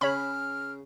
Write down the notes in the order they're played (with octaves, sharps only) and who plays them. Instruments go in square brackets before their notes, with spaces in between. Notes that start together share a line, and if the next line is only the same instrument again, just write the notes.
[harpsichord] C#3 [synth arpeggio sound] C#5 B5 [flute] F6